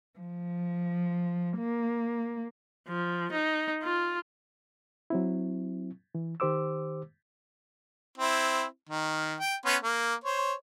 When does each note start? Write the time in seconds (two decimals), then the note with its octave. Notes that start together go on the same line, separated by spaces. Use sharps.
0.19 F3
1.58 A#3
2.88 F3
3.32 D#4
3.83 F4
5.10 F#3 C4 E4
6.15 E3
6.40 D#3 G4 C5 D6 E6
8.18 C4 E4
8.89 D#3
9.40 G5
9.65 B3 C#4 C6
9.83 A#3
10.24 C5 C#5